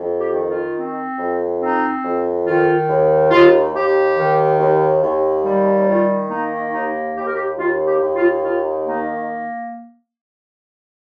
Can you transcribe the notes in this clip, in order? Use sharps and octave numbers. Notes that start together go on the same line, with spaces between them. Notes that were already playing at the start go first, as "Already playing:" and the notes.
Already playing: F2
G4
D#3
F4
C4
F2
C4 D#4
F2
D#3 F4
D#2
D#2 F4
D#2 G4
D#3
D#2
D#2
G3
D#3 F4
A#3 D#4
D#2 D#4
D#2 G4
A#4
G4
D#2 F4
G4
D#2
F4
D#3 F4
A#3 D#4